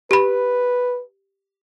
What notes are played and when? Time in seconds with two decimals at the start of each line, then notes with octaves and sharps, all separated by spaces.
0.11 G4 B4 B5